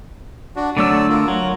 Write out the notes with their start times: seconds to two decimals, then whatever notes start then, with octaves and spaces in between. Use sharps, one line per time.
0.56 D4 F#4
0.77 D3 F#3 A3 D5 E6
1.09 F4 A#4
1.28 F#3